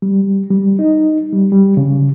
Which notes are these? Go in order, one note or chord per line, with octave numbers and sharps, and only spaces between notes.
G3
G3
D#4
G3
G3
C#3